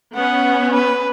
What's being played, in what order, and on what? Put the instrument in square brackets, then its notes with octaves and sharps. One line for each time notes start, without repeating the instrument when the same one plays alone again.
[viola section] B3 C#4 [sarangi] F#5
[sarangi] B4